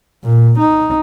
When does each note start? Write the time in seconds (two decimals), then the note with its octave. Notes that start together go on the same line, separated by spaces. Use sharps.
0.24 A#2
0.59 D#4